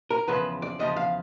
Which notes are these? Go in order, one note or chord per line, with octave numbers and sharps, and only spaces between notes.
A#4
E2 C#3 F3 B4
D5
E2 C#3 F3 D#5
F5